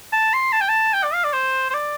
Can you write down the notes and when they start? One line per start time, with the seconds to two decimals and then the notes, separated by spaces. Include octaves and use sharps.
0.13 A5
0.33 C6
0.53 A5
0.61 G5
0.69 A5
0.93 G5
1.03 D5
1.13 F5
1.24 D5
1.33 C5
1.70 C5
1.74 D5